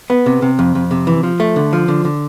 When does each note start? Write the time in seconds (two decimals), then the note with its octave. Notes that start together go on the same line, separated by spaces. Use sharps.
0.10 B3
0.26 C3
0.42 C3
0.59 F2
0.75 F2
0.91 C3
1.07 E3
1.23 F3
1.40 A3
1.56 D3
1.73 F3
1.88 D3
2.05 D3